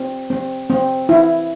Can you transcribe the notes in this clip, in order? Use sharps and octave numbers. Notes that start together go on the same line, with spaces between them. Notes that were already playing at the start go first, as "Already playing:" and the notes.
Already playing: C4
C4
C4
E4